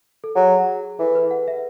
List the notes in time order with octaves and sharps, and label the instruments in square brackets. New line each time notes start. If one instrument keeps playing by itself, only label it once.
[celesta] A4
[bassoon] F#3 [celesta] G#4
[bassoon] E3 [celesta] A4
[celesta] B4
F#5
E5